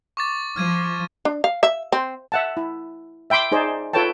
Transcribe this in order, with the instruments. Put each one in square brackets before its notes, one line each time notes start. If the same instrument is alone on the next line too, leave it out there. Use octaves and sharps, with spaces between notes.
[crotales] C#6 D6 A6
[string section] F3 [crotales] F6 G#6 D#7
[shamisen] D4
F5
E5
C4
[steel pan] E5 F#5 A5
E4
E5 G5 B5 C6 D6
D#4 G#4 C5 D5
F4 A4 B4 C#5 G5 A5